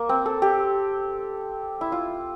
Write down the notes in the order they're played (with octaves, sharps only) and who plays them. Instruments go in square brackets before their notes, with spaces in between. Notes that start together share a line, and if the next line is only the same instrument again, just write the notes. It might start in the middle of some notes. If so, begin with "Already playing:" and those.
Already playing: [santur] A#3
C4
A4
G4
E4
F4